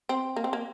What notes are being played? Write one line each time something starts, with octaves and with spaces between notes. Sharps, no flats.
C4
A#3
C4
A#3